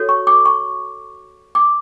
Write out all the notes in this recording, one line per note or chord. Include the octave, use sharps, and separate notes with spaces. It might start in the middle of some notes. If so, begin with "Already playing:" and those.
Already playing: F#4 A4 C#5
C#6
D6
C#6
D6